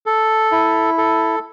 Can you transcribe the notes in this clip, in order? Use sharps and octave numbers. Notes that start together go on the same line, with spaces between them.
A4
E4
A4